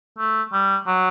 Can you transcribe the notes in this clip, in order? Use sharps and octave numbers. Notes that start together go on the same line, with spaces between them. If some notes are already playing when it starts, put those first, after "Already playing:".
A3
G3
F#3